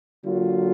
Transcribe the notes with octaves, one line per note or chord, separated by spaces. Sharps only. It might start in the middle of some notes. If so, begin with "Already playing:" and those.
D3 F#3 A#3 F4